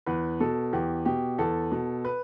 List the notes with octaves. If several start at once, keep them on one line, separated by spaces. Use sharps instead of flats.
E2 B4
B2 A4
E2 G4
B2 G4
E2 A4
B2
B4